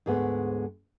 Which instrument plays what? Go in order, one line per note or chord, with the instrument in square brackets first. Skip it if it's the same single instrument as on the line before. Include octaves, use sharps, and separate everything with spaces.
[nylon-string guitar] D2 G#2 G#3 A3 B3